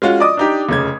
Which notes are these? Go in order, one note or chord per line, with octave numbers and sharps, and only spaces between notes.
G#3 C#4 F4 F#4
D5 D#5 D6 D#6
D4 D#4 G4
F1 C#3 G#6